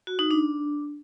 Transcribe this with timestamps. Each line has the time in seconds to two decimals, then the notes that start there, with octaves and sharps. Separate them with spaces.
0.07 F#4
0.19 D#4
0.31 D4